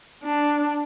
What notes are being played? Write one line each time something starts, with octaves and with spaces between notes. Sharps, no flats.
D4